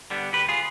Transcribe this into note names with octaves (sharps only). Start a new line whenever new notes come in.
D3 G3 B3
D2 G4 B4
F4 G#4